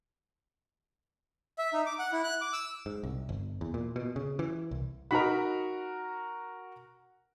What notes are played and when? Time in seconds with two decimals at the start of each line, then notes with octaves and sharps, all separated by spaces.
1.58 E5
1.73 D#4
1.86 D6
1.99 F#5
2.12 E4
2.24 F#6
2.41 D6
2.53 E6
2.86 G#2
3.03 C2
3.29 G1
3.61 E2
3.74 A#2
3.96 B2
4.16 C#3
4.39 E3
4.71 C2
5.11 D#4 F#4 A#4 B5